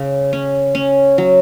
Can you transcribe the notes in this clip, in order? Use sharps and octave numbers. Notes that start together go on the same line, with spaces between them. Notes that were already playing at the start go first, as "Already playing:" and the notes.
Already playing: C#3
C#4
C#4
F#3